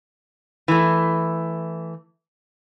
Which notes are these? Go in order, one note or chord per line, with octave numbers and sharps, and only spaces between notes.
E3 A3